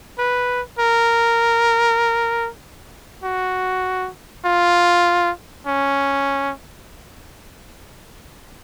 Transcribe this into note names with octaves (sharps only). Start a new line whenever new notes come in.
B4
A#4
F#4
F4
C#4